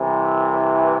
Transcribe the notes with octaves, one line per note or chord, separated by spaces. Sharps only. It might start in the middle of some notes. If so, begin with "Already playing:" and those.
Already playing: C2 C3 E3